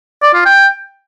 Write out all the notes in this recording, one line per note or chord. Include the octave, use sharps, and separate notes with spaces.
D5
F4
G5